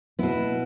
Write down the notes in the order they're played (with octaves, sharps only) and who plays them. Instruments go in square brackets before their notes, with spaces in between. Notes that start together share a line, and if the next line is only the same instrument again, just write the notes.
[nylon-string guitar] B2 B3 E4